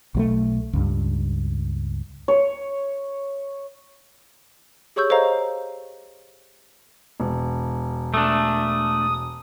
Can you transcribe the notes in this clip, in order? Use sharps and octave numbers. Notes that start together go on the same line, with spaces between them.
B1 F#3 A3
C#2 G2
C#5
G4 G#4 C#5 C#6 E6 G6
A4 C5 C#5 D#5 F5 A#5
E1
A3 D4 D#6